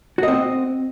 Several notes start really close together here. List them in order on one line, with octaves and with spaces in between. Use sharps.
F#4 D#5 C4